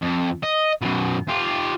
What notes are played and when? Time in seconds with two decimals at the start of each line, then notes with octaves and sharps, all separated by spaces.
0.02 F2
0.43 D#5
0.82 F#2 B2
1.29 F4 G4